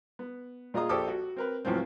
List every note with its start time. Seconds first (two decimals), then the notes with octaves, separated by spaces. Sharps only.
0.19 B3
0.74 A#2 F4 G#4 D#5 A#5 D#6
0.89 A#1 G4 A4 C5 D6 D#6
1.08 F#4
1.36 C4 A#4 B4
1.65 C#2 A2 F3 F#3 C4